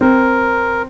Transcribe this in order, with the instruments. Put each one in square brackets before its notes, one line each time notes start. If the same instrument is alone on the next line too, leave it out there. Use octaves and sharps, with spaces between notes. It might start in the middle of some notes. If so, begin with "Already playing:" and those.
[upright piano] C4 [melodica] A#4